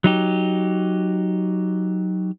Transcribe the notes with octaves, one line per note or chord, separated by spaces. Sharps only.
F#3 D#4 G4